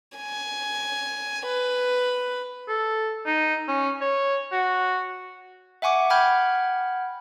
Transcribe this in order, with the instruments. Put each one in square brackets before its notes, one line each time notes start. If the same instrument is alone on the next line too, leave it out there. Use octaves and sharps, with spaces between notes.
[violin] G#5
B4
[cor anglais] A4
D#4
C#4
C#5
F#4
[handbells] E5 F#5 G#5 C#6 D6
F#5 G5 B5 F6 G6 G#6